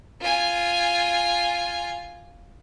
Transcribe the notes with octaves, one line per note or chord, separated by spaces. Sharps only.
F4 G#5